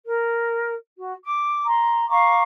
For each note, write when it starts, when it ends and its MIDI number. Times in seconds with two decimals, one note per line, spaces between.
0.04 0.72 70
0.95 1.12 66
1.22 1.65 86
1.67 2.07 82
1.67 2.07 84
2.08 2.43 77
2.08 2.43 82
2.08 2.43 85
2.08 2.43 86